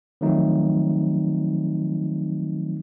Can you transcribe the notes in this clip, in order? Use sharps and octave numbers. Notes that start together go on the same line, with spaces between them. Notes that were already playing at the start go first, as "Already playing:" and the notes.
D#3 F3 F#3 A3 C4 D#4